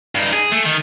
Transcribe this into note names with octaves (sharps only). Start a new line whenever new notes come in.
G2 D#4
G#4
A3
D#3